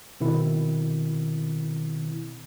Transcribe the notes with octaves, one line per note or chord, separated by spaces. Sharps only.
B2 D#3 C4 E4